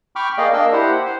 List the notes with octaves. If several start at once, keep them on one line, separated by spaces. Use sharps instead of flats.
G5 B5 C#6 D6 F6
A#3 G#4 D5 D#5 F5 G5
A#3 D4 A#4 D#5 E6
E4 G4 C5 F#5
F#5
C5